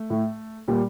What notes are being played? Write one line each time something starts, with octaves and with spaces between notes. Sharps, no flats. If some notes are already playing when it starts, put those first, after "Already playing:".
Already playing: A3
A2
A#2 G3